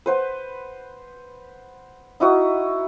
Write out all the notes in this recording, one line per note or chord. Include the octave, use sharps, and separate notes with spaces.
B4 C5 F#5
D#4 E4 F#4 D#6